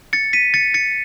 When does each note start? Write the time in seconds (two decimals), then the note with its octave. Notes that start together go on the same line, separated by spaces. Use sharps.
0.13 A6 C#7
0.33 B6 D#7
0.54 A6 C#7
0.74 A6 C#7